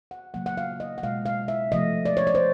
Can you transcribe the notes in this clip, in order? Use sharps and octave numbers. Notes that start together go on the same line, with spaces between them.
F#5
C#3 F#3 A#3 F#5
F#5
F5
D#5
F#5
B2 G#3 F5
F5
E5
C3 F3 A3 D#5
D5
C#5
D5
C5